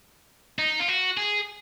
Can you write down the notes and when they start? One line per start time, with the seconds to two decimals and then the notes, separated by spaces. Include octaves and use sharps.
0.59 D#4
0.79 F4
0.88 F#4
1.17 G#4